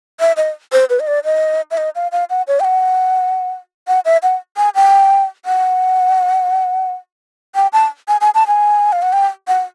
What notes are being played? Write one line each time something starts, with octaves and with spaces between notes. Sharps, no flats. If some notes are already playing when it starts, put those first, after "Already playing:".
E5
D#5
C5
B4
D#5
D5
D#5
E5
D#5
F5
F5
F#5
C#5
G5
F#5
F#5
E5
F#5
G#5
G5
F#5
G5
A5
G#5
G#5
A5
G#5
F5
F#5
G5
F#5